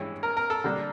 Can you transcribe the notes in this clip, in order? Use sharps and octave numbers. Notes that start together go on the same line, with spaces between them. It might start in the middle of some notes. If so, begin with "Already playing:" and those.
Already playing: G2 E3 G#3 C#4
A#4
A#4
A4
D3 G3 A#3 D4